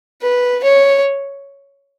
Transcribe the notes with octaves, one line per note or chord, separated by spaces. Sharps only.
B4
C#5